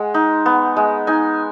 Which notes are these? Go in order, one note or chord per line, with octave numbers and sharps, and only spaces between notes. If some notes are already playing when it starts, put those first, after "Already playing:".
Already playing: G#3 F#5 G#5
D#4
B3
G#3
D#4 G#5